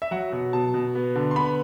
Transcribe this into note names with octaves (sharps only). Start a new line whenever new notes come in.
E5
F#3 F#5
B2
B2 A5
B2
B3
D3
C6
B3 B5